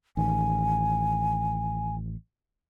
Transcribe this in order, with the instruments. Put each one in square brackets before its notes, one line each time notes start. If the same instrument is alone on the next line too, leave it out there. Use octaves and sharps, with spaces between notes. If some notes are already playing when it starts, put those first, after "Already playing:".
[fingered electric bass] A1 D#3 [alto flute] G#5